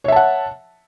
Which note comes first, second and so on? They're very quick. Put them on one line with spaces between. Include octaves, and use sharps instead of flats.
C#5 E5 A5 F#5